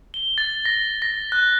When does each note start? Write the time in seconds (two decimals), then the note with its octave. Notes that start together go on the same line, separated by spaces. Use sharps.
0.14 G7
0.38 A6
0.65 A#6
1.02 A#6
1.32 F#6